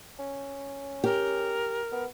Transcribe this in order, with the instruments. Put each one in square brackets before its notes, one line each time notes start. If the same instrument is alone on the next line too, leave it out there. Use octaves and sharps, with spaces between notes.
[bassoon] C#4
[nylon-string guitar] G4 [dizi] A#4
[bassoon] B3